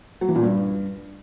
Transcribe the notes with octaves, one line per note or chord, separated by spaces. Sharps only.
F#3
E3
A#2
G2